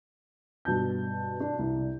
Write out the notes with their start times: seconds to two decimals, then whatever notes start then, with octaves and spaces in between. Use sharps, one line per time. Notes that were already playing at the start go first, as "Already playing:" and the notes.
0.65 G2 B2 A5 G6
1.40 D4
1.59 C2